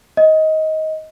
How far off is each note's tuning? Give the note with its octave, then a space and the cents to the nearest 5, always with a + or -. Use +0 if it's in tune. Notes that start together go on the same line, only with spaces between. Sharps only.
D#5 +20